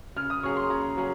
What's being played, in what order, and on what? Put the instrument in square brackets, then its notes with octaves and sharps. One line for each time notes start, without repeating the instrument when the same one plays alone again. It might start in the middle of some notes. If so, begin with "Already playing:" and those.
[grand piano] C#3 [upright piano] F6
[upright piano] D#6
[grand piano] F#3 A#3 C#4 G#4 [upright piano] C#6
[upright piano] C6
[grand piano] C#3 [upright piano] A#5
[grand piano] F#3 A#3 C#4 G#4